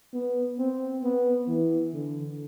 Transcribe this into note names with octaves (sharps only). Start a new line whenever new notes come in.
B3
C4
B3
E3
D3